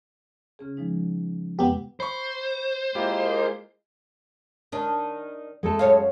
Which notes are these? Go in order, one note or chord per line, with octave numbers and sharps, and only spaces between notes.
C#3 C#4 G#4
F3 G#3 D#4
F2 C3 G#3 B3 G4
C5 B5 C#6
G#3 A#3 E4 F4 G4
D#3 D4
G#3 A3 A4
F#2 C#5 F5